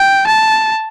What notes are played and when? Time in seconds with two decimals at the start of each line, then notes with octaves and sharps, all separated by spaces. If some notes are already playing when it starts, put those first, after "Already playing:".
Already playing: G5
0.26 A5